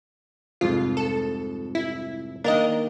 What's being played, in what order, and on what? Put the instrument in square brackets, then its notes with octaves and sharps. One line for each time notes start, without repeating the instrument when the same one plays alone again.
[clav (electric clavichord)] C2 F2 G#2 [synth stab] F4
[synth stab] A4
E4
[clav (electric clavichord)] D#3 A#3 [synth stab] D4 A#4 D#5